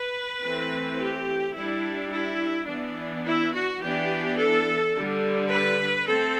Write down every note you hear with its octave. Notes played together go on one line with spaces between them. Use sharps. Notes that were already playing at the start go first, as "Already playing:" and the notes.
Already playing: B4
E3 A3 C4
G4
G3 D4 E4
E4
E3 B3 D4
E4
F#4
E3 B3 D4 G4
A4
D3 G3 D4
B4
A3 C4 A4